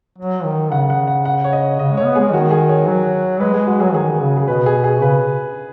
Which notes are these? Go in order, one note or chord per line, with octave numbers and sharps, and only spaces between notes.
F#3
D#3
C#3 F#5
F#5
F#5
F#5
C#5
D#5
C#3 D#5
G#3
C#5
B3
G#3 G#4
D#3 F#4
G#4
C#5
F#3
G#3 B4
G#3 G#4
G#3 F#4
F#3 G#4
D#3 G#4
D#3
C#3
G#4
B2 B4
G#4
G#4
C#3 B4